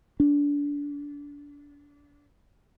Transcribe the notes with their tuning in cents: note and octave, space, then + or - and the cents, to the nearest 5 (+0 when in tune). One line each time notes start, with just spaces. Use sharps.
D4 -25